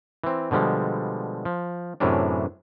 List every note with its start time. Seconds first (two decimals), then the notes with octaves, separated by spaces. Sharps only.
0.24 E3 C4
0.51 B2 D3 F3 G3 G#3
1.45 F3
2.00 F#2 A2 C3 E3 C#4 D4